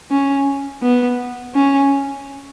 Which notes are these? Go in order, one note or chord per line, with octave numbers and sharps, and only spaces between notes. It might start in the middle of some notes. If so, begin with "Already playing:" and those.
C#4
B3
C#4